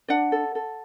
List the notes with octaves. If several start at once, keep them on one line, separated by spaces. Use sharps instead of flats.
D4 D5 F#5
A4
A4